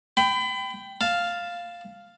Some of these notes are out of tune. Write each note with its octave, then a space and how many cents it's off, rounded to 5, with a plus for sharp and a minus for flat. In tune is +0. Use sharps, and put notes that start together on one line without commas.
G5 +0 B5 +30
F5 +0 A5 +0